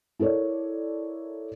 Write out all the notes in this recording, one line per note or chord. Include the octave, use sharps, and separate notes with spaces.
E4 A4 A#4 C#5 D5